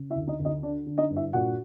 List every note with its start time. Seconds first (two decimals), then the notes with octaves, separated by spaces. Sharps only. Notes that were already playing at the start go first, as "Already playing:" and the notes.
Already playing: C#3
0.10 E4 E5
0.16 D2
0.27 D#4 D#5
0.39 D2
0.45 D#4 D#5
0.63 D3 D4 D5
0.86 D3
0.98 D#4 D#5
1.10 G2
1.16 E4 E5
1.33 A#2 F#4 F#5